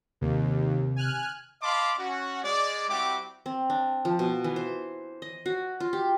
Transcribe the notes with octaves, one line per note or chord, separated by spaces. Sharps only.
D#2 C3
G#5 F6 F#6
D#5 F5 A5 B5 C6 D6
C#4 F#4
G#3 D5
G3 C4 E4 F#4 G4 D6
C4
D4
F3
B2
E3
C5
D#5
F#4
F4
G4